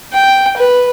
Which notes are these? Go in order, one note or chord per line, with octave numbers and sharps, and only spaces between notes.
G5
B4